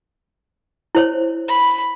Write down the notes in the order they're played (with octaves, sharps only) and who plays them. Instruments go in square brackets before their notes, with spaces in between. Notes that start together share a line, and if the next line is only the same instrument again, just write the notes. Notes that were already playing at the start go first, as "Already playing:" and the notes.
[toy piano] E4 C5 C#5
[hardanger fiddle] B5